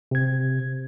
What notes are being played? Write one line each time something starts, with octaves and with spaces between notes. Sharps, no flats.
C3 G#6